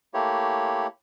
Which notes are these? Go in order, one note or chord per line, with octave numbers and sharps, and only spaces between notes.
A3 A#3 E4 G4 C#5